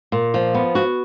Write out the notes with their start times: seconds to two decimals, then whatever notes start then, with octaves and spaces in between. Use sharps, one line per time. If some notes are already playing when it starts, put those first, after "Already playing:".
0.12 A#2
0.34 F3
0.54 B3
0.75 F#4